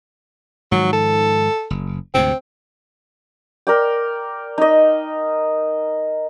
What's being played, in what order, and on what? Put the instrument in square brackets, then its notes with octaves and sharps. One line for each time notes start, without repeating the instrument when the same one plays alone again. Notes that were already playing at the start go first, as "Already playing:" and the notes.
[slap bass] G#2 D#3 F3 [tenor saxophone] F#3
[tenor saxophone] A4
[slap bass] F#1
[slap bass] D2 G#2 C3 [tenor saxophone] C4
[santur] A#4 D5 G5
D#4 D#5